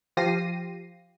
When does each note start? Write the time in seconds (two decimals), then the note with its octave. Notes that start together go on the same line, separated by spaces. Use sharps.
0.17 F3 F4 G4 A#6 C7 D#7